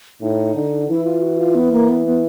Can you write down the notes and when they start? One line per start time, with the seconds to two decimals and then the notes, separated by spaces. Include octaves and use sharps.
0.21 A2 D#4
0.55 D3
0.89 E3 E4
1.05 F4
1.22 F#4
1.38 F4
1.55 B3
1.72 A#3
1.89 B3
2.06 B3